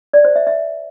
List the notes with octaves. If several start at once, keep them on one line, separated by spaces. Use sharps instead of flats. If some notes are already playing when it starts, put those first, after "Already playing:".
D5
C5
E5
E5